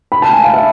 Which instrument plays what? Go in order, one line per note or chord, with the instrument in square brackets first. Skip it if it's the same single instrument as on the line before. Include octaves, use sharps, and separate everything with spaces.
[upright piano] B5
A5
G#5
F5
E5